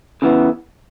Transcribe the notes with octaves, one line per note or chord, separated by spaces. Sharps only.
C#3 E3 B3